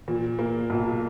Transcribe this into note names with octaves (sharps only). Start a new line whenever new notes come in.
A#2
A#3
B1